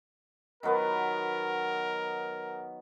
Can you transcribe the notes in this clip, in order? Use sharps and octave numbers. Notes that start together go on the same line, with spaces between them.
D#3 F#3 B3 A#4